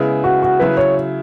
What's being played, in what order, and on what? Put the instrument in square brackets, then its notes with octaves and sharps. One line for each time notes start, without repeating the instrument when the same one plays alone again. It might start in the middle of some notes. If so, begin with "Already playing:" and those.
Already playing: [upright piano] C#3 G#3 B3 E4
[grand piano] F#4
F#4
[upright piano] C#3 F#3 E4 [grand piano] B4
[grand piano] C#5